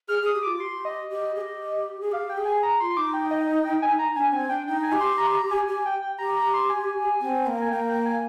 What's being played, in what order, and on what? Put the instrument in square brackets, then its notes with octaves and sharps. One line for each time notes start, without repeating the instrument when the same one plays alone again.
[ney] G#4 [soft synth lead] F6
[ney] G#4 [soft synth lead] D#6
[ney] G4
[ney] F4 [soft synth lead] D6
[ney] G4 [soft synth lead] C6
[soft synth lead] D#5
[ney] G4
G#4
G4
G#4
[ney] G4 [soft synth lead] F5
[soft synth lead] G5
[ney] G#4
[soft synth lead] G#5
A#5
[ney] F4 [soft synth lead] C6
[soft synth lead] C6
[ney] D#4 [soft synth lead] D6
[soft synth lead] G5
D#5
D#5
G5
G#5
A#5
[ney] D4 [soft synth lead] G#5
[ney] C4 [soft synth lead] G#5
[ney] D4 [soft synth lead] G5
[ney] D#4 [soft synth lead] G5
[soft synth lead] G#5
[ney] G4
[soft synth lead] C6
A#5
C6
A#5
G#5
[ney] G4 [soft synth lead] G#5
[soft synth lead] G5
G5
[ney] G4 [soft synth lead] A#5
[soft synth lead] A#5
C6
G#5
[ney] C4
A#3
[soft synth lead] G#5
[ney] A#3 [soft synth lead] G5
[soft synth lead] G5
G#5